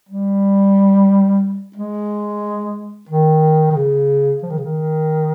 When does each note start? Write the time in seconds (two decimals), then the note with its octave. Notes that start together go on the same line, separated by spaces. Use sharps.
0.09 G3
1.76 G#3
3.09 D#3
3.71 D#3
3.76 C#3
4.43 F3
4.50 D#3
4.58 C#3
4.65 D#3